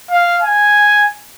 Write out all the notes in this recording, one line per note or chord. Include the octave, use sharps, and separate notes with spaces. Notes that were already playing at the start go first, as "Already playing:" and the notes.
F5
G#5